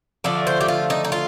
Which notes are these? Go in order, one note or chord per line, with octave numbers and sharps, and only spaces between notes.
D3 F3 A3 D5
C5
G4
F4
D#4
D#4
F4